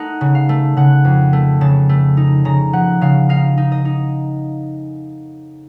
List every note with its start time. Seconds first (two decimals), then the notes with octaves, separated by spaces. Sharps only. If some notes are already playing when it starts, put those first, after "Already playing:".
Already playing: A3 D#4 F#5
0.21 C#3
0.35 F5
0.49 A3
0.77 C#3 F#5
1.05 F2
1.33 A3
1.61 C#3 A5
1.89 A3
2.17 D#4
2.45 C#3 A#5
2.73 F3 F#5
3.01 C#3 F5
3.29 D#4 F5
3.58 D#4
3.72 D#5
3.85 D#4